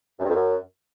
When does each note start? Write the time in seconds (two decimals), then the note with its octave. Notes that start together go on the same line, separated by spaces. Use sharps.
0.19 F#2
0.24 G2
0.29 F2
0.34 F#2